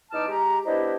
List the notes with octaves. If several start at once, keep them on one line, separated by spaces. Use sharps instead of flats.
E2 D#4 A5 D6 F6
G#3 G4 A#5
B3 D4 E4 G4 C5 D#5